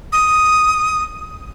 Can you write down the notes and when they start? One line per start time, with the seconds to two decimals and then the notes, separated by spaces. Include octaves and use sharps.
0.12 D#6